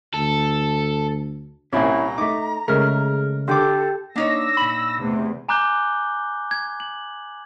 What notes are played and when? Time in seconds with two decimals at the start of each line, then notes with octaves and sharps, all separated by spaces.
0.14 D2 A4
1.73 C2 A#2 C#4 E4 A#5
2.18 A3 D#4 D6
2.68 C#3 G#3 A3 G#4 A#4 F6
3.48 D3 G4 A4 G5 D6 G6
4.16 A#3 D4 D#4 C#5 E6 A#6
4.57 A#2 B5
5.01 E2 C3 A3
5.49 G#5 A#5 D6 F#6 G6 G7
6.51 G#6
6.80 F#7